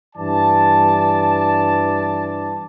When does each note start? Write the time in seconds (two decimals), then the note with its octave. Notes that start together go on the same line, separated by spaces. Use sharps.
0.16 G2 E3 D5 A5